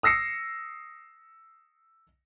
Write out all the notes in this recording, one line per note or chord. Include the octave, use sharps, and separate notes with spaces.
D#6 E6 A#6 C7 C#7